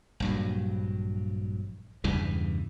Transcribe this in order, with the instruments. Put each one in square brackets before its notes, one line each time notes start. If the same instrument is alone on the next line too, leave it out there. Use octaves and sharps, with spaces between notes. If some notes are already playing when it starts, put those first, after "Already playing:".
[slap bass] A#1 G2 F#3
E2 G2 C#3 E3